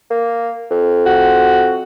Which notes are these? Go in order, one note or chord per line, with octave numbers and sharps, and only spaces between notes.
A#3
F2
F#4